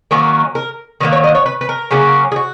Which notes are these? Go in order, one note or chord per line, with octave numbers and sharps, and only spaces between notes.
D#3 F#3 A#3 C#4
A#4
D#3 F#3 A#3 B4
C#5
D#5
C#5
B4
B4
A#4
C#3 F#3 A#3 C#4
G#4
F#4